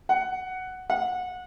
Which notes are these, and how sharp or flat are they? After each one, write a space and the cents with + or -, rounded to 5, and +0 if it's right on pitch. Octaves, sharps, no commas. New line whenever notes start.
F#5 +5
F#5 -25